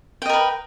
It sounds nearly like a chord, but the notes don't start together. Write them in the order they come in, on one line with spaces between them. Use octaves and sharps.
G5 D#5 A#4 B4